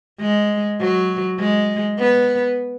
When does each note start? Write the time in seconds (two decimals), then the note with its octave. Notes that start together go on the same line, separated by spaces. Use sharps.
0.21 G#3
0.80 F#3
1.39 G#3
1.99 B3